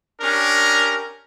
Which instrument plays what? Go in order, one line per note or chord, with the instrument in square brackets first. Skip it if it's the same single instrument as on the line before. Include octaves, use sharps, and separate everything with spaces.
[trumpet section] C#4 D4 G4 A#4